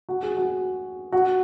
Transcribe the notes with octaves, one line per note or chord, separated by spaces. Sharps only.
F#4
G#4
F#4
F#4